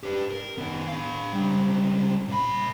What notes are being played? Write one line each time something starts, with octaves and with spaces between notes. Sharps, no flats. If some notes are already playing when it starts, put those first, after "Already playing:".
G4 B4
A#4
D#3 B3
D4 F5
C#2 G3
A#2 B5